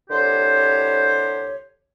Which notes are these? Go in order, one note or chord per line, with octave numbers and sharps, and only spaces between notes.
C2 D3 G4 C5 C#5